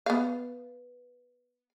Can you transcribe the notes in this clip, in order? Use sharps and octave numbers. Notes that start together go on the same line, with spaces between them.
B3 F5